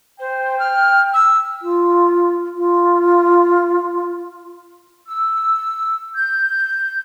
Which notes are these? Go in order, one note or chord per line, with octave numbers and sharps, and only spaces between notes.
C5 G5
F6
E6
F4
F4
E6
G6